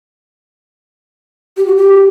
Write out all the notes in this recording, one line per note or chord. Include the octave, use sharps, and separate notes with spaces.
G4
F#4
G4